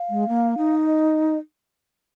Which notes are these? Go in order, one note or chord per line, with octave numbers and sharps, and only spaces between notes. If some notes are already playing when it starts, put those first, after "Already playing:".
Already playing: F5
G#3
A#3
D#4
D#5